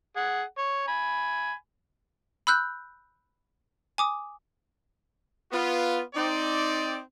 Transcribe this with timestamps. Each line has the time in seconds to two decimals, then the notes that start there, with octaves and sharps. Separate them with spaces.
0.16 G#4 F#5
0.58 C#5
0.88 G#5 B5
2.47 B5 E6 F#6 G6
3.98 G#5 D6 D#6
5.52 B3 F4
6.15 C4 D#4 D5